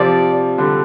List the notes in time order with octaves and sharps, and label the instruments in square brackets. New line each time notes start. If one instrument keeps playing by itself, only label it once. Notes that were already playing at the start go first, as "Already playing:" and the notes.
Already playing: [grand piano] C3 F3 [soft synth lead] D5
[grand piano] D3 G3